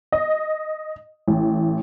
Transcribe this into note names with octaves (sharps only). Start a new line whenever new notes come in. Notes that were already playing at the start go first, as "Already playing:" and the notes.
D#5
A1